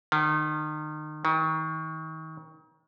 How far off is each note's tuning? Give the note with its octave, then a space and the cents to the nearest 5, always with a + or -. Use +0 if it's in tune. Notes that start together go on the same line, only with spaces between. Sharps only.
D#3 -30
D#3 +35